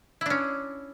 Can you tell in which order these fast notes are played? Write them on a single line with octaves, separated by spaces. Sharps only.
E4 D4 C#4